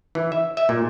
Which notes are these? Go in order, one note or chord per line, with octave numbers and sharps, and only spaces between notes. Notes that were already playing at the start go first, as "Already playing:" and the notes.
E3
E5
E5
A#2